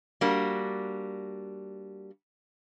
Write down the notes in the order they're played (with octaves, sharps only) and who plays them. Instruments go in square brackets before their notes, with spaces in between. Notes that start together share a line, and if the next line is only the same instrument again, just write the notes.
[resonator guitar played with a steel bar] G3 A#3 D4 F#4